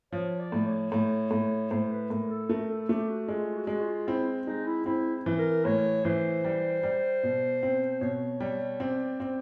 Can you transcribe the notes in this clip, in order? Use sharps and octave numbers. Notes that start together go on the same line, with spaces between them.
F3 C#5
D5
A2
C#5
A2 C#5
A2
A2 C5
B4
A2 A#4
A4
A3 A#4
A4
A3 G4
F#4
G#3 F4
F#4
G#3
F4
C4 E4
G#3 D#4
E4
C4 E4
E3
A#4
A2 C#5
E3 C5
G3
G3
B2
C4
B2 C#5
G3 C#5
C4 D5
C4